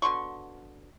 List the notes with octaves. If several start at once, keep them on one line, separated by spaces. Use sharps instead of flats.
B2 D3 C6 C#6